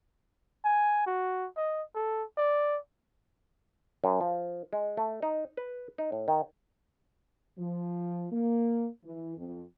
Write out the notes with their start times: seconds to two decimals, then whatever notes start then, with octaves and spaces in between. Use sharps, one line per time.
0.65 G#5
1.06 F#4
1.57 D#5
1.95 A4
2.38 D5
4.04 F#2
4.21 F3
4.73 G#3
4.97 A3
5.22 D#4
5.57 B4
5.98 D#4
6.12 A2
6.28 D#3
7.58 F3
8.32 A#3
9.04 E3
9.37 F2